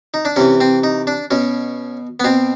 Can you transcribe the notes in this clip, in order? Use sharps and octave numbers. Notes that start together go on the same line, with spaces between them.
D#4
D4
C3 E3 C#4
C4
D#4
D4
B2 C#4
B3
B2 C4